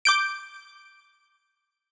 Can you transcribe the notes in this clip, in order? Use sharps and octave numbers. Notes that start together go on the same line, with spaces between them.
D6 G6 D7